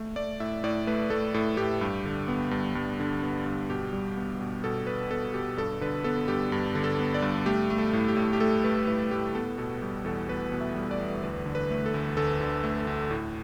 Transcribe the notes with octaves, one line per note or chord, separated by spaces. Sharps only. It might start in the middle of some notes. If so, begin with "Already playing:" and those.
Already playing: A3
A3 D5
A2 E5
A2 D5
A3 B4
A3 A4
A2 A4
A2 G4
G2
D3
B3
G2
G2
D3
B3
G2
B2 G4
G3
B3
B2
B2 A4
G3 B4
B3 A4
B2 G4
G2 A4
D3 B4
B3 A4
G2 G4
G2
D3
A4
B3
D5
G2
A3 G4
A3
A4
A2
G4
A2
G4
A3 A4
A3 B4
A2 B4
A2 G4
B3 A4
B2 A4
G3 G4
E2 A4
B3 B4
B2
E5
G3
D5
E2
D2 B4
D3
B4
A3
A4
D2
D2 A4
D3
A3
D2
A2